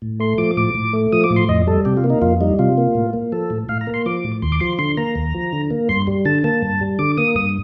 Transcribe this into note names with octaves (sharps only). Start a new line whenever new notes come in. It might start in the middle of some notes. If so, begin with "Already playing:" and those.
A2
A3 C6
F3 D6
A2 D6
A2
A3
F3 D#6
D6
A2
C6
F2 D#5
G3 A4
C3 G4
F4
A#3
D#4
F2 F4
G3 D#4
C3 F4
A#3
A2
A#3
F3 A4
A2
A2 F5
A#5
A#3
C6
F3 D6
A2
D#2 C6
D6
F3 C6
D3 C6
A#3 A#5
D#2
F3
D3
A#3
G2 C6
G3
D3 A5
A#3 A5
G2
G3
D3 D6
A#3 D#6
G2 D#6